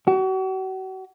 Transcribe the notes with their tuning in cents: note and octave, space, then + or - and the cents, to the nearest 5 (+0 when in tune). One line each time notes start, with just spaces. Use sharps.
F#4 +40